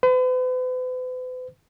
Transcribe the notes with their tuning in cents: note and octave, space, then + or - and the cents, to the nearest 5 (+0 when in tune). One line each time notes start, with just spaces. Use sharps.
B4 +45